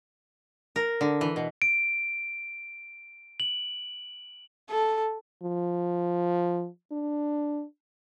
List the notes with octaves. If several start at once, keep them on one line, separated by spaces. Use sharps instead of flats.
A#4
D3
E3
B2
D7
F#7
A4
F3
D4